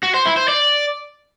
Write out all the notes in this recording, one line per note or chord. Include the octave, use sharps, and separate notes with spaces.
F#4
C5
E4
C5
D5